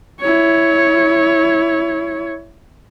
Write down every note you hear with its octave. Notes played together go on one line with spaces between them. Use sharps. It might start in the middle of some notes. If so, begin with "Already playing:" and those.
E4 C#5